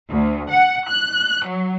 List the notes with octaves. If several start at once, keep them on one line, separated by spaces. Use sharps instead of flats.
D2
F#5
F#6
F#3